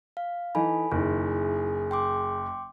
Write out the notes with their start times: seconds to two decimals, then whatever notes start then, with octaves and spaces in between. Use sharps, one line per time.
0.17 F5
0.55 E3 D#4 A4 G#5 B5
0.91 F#1 D#3 E4 G#4
1.91 G5 C6 D6